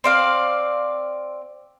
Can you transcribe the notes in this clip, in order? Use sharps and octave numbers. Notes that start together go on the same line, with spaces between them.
C4 D5 F5